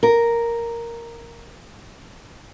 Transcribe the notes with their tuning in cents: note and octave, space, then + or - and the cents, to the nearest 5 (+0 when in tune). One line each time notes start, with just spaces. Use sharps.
A#4 +0